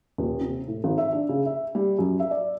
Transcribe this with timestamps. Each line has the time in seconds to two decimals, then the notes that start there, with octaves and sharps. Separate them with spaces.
0.18 D#1
0.41 C3
0.68 A2
0.84 G#1
0.98 E5
1.13 D4
1.29 C#3
1.46 E5
1.75 G3
1.99 F#2
2.19 E5
2.31 D5